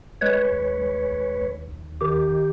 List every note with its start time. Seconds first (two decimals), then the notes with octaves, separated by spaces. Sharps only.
0.21 G#3 B4 C#5
0.52 D#2
0.82 G#3
1.12 D#2
1.41 D#2
1.71 D#2
2.01 D#3 G4